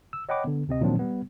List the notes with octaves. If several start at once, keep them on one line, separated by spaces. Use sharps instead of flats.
E6
C#5 D#5 F#5 G5 B5 D6
D3 B3
D2 C3 C4 D#5
A#2 D#3 F3 F#3 C4 D4
G3 B3